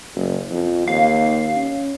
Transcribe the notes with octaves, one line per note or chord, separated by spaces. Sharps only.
F#1
F2
D#2 F5
C#4